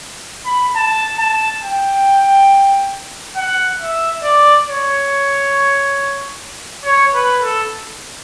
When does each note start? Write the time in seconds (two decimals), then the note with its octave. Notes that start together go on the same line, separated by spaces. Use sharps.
0.46 B5
0.76 A5
1.18 A5
1.63 G5
3.37 F#5
3.81 E5
4.24 D5
4.68 C#5
6.85 C#5
7.14 B4
7.43 A4